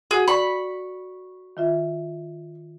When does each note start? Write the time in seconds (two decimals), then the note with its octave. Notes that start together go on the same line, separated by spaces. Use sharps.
0.11 F#4 G#4 A4 F#5
0.28 D5 B5 C#6
1.57 D#3 F4 E5